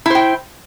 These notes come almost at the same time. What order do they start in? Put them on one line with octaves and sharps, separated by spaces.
E4 C5 G5